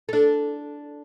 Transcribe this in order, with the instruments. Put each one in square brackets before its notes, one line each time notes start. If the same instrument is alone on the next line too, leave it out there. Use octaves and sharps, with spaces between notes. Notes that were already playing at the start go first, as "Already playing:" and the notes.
[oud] D4 A4